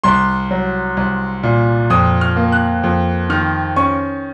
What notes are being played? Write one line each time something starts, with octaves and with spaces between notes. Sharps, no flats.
C2 C6
F#3
C2
A#2
F2 D#6
F6
A#3
F#6
F2
D#3 F6
C#4 C#6